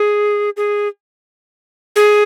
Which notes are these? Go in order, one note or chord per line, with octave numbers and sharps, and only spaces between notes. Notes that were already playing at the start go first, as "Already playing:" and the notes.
Already playing: G#4
G#4
G#4